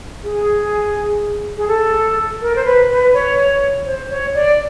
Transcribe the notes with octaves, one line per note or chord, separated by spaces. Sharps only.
G#4
G#4
A4
A#4
C5
B4
B4
C#5
C5
C#5
D5